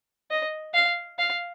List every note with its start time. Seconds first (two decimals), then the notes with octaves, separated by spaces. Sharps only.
0.30 D#5
0.74 F5
1.19 F5